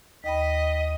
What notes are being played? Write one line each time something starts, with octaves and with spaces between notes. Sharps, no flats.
D#2 D#5 G5 B5 B6